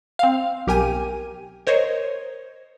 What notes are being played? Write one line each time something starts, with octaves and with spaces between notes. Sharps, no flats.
C4 F5
B1 G4 A#4 G5 G#5 D#7
A#4 C5 C#5 D#5